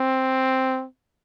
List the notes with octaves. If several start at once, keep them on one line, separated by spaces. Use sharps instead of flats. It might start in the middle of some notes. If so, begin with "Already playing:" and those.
Already playing: C4